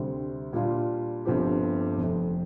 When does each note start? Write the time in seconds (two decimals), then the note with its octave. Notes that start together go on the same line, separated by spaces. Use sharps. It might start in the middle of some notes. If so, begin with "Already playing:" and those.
Already playing: D2 C3 G3 C4
0.53 A#2 G3 D4 F4
1.25 G1 G2 F3 C4 G4
1.98 F1 F2 C3